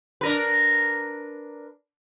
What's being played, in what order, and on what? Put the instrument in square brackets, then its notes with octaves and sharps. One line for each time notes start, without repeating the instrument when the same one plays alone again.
[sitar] D4 A#4 B4